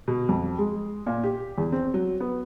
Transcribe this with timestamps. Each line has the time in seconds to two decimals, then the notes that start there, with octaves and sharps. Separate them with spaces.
0.08 B2
0.29 F2
0.59 G#3
1.07 A#2
1.24 G4
1.58 E2
1.72 C4
1.94 F#3
2.20 B3